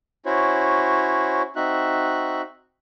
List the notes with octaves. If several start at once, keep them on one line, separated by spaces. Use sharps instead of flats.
C#4 E4 F#4 C5 C#5
C4 D#4 F#4 E5 F#6